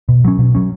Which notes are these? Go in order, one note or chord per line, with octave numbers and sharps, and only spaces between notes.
B2
F#3 C#4
B2
F#3 C#4